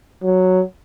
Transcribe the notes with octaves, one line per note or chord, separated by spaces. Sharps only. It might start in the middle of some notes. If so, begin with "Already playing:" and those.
F#3